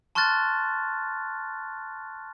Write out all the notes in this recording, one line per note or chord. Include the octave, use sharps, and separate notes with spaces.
A5 C6 C#6 F6 F#6 A6